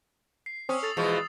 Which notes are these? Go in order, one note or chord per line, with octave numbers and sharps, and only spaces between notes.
C7
C4 C#4 D#6 E6
A4 A6 C7 F7
E2 B2 F3 G#3
F7